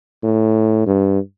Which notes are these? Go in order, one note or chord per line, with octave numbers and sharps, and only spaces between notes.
A2
G2